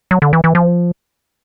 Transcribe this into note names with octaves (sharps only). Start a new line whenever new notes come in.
F#3
D3
E3
E3
F3